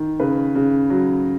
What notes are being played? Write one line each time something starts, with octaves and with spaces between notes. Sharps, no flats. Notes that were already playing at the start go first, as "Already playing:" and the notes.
Already playing: D#3
C#3 B4
C#3
F#3